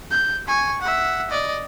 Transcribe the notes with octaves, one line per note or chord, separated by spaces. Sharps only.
G6
G#5 C#6
E5 F#5
D5 D#5